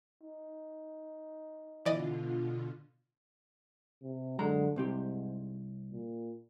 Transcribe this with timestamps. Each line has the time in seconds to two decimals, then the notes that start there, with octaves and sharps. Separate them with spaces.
0.22 D#4
1.85 B2 D3 E3 F4 D5 D#5
4.03 C3
4.39 F#2 D3 G#3 A#5
4.76 C2 G#2 C4 G4
5.92 A#2